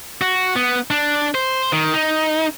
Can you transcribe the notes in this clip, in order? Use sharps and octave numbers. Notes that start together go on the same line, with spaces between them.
F#4
B3
D4
C5
D#3
D#4